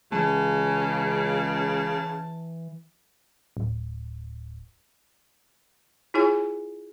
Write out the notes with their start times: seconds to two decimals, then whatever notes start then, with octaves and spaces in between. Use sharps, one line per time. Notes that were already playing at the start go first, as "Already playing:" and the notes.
0.12 C#2 C#3 E3 A5
3.57 D1
6.14 E4 F4 G#4 C#5 G#5